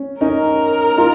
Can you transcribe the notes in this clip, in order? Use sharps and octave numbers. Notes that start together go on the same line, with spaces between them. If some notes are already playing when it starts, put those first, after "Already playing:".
Already playing: C#4
C#4 D#4 A#4
D#4 F4